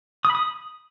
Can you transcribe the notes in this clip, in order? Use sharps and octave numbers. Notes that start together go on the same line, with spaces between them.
D#6
B5
D#6